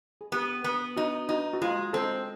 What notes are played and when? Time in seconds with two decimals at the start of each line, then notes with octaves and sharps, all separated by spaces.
0.21 G#4
0.32 B3 G4
0.64 B3
0.97 D#4 F#4
1.29 D#4 F#4
1.53 F#4
1.62 G#3 F4
1.93 C4 A4